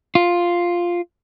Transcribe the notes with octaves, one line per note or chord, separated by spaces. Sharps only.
F4